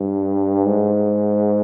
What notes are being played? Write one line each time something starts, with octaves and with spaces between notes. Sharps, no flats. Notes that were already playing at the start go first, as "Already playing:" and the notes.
Already playing: G2
G#2